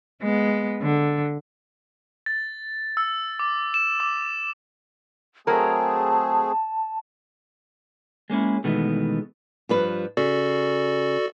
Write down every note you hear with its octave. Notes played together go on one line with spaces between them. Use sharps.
G#3 B3
D3
A6
E6
D6
E7
D6
F#3 A3 C4 G#4 A#4 A5
G#3 A#3 C#4 E4
B2 D#3 E3 G#3 A3 B3
G2 F3 B4
C#3 F#4 A4 D5